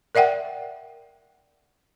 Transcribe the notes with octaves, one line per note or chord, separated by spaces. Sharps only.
A#4 D5 E5 F#5 G5